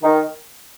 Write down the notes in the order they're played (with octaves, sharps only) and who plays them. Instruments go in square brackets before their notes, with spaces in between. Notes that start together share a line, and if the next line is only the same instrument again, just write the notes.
[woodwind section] D#3